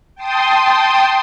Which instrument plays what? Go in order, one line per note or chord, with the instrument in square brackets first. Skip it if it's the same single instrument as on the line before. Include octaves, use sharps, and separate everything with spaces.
[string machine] G5 A5 C6 D#6